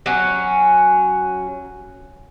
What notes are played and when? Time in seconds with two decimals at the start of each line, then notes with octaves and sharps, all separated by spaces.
0.06 F#3 C#4